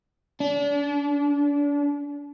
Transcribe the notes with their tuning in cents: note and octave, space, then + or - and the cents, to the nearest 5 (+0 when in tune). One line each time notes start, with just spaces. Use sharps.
D4 -35